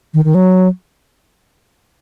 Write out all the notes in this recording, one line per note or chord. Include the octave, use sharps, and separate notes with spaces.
D#3
D#3
F#3